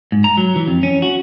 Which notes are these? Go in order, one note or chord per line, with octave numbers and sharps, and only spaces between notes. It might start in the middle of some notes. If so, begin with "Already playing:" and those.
G#2
A#5
F#3
E3
F2
C#4
F#4